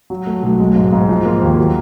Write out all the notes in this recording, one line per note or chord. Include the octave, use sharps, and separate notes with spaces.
F#3
A3
B1
G#3
G#2
G#2
F3
A#3
D#2
F#3